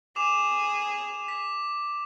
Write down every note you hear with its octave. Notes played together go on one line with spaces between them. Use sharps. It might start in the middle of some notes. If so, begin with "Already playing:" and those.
G#4 D6 E7 F7
B6